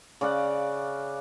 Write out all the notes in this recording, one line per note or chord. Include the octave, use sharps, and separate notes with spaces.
C#3 D5 F5 F#5